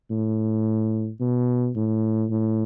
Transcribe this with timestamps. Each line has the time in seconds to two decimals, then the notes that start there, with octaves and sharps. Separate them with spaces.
0.11 A2
1.21 B2
1.76 A2
2.31 A2